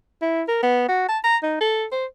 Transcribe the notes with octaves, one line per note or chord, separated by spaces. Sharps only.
E4
A#4
B3
F#4
A5
A#5
D#4
A4
C5